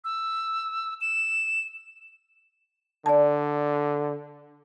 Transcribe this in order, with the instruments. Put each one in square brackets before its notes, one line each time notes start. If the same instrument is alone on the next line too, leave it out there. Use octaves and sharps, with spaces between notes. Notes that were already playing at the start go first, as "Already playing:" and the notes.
[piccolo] E6
E7
[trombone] D3 [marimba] D5 A5